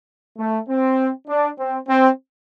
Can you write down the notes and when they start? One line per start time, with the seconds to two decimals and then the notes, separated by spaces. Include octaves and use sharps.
0.38 A3
0.68 C4
1.28 D4
1.58 C4
1.88 C4